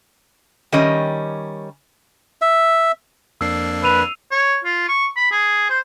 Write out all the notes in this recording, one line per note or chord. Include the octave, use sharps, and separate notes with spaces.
D#3 G3 C#4 D#5
E5
F2 A#3 D4 E6 C7
B4 E6 D#7 F7
C#5
F4
C#6
B5
G#4
C5